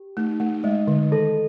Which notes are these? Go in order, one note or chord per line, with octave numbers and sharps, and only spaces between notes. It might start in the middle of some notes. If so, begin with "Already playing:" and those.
Already playing: G4
A3 D#4
A3
G#3 D#5
D3
D#3 A4